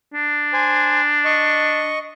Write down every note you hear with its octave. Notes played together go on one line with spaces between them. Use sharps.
D4
C5 G#5
D#5 C#6